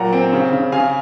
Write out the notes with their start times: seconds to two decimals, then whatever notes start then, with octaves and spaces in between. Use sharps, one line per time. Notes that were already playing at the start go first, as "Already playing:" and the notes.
Already playing: A#2 F#3 F#5 A#5
0.13 C4
0.33 C#3
0.53 C#3
0.72 C#3 F5 G#5